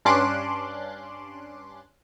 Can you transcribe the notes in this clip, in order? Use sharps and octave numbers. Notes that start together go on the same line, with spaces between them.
G2 C#4 D4 C6 D6 F#6